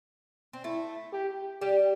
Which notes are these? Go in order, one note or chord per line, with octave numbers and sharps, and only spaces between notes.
C4
A3 E4
G4
G3 G4